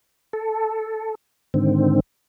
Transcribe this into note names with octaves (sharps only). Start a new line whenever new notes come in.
A4
G#2 D3 D#3 C4